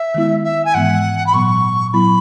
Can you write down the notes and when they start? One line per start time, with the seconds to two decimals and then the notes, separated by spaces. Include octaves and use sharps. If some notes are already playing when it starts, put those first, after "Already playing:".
Already playing: E5
0.15 D#3 G#3 B3 E4
0.44 E5
0.65 G#5
0.74 G#2 E3 G#3 B3 F#5
1.26 B5
1.33 A#2 F#3 B3 C#6
1.93 A#2 F#3 B3 E4 B5